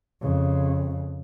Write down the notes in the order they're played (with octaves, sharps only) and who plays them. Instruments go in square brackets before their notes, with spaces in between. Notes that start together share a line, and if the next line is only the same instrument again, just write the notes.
[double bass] F2 C#3